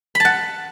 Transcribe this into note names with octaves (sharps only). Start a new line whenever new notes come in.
F#5 A5 B5